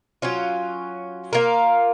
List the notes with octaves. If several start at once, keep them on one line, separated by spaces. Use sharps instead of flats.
F#3 C#4 F4
A#3 F4 A#4